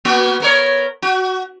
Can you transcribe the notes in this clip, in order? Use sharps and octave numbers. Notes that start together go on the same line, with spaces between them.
A#3 B3 F#4
B3 A#4 C#5
F#4